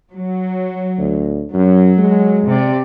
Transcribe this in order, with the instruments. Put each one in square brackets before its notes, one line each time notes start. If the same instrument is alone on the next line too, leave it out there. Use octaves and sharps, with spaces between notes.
[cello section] F#3
[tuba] D2
[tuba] F#2 [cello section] F#3
[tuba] G#3
[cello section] C3 D5